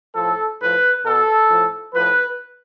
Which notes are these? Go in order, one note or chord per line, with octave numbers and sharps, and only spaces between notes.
A2 F3 A4
A2 F3 B4
B2 A4
A2 F3
A2 F3 B4